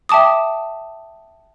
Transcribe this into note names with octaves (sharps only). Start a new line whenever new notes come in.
E5 G5 A5 D6 D#6